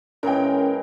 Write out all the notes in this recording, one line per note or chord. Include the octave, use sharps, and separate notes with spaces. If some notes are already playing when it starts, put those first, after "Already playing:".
A#2 E3 G#3 C#4 A#4 G5